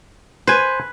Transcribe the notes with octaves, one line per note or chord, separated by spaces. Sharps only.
B4 C5 G#5